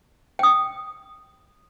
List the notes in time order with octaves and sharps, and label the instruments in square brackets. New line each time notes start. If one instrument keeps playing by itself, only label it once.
[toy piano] G5 D#6